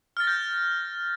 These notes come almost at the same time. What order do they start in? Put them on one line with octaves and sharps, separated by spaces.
F6 A6 A#6 G6